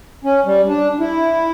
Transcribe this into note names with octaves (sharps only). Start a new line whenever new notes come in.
C#4
G3
D4
E4